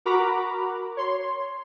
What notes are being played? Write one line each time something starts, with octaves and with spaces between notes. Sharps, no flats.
F#4 A#4 A#5 B5 D6
C#5 C6